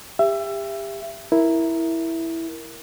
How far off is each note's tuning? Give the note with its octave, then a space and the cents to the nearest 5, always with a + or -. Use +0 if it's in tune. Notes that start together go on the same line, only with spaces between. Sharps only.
G4 +30 E5 +25
E4 +0 A#4 +0